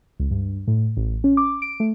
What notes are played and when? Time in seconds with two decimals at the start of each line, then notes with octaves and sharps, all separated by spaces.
0.20 C#2
0.31 G2
0.68 A2
0.97 A1
1.24 C#4
1.37 D6
1.62 D7
1.80 A3